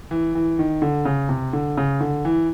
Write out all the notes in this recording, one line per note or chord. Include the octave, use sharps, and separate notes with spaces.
E3
E3
D#3
D3
C#3
C3
D3
C#3
D3
E3